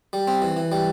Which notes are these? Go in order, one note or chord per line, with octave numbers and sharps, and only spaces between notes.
G3
C4
E3
E3
G3